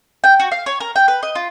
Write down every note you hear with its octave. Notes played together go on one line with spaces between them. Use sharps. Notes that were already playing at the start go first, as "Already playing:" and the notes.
G5
F#4
F5
C#5
A#4
G5
B4
D#5
F4